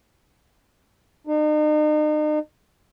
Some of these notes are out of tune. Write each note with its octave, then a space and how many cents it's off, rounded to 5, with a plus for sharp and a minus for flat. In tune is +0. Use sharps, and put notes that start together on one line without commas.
D#4 -40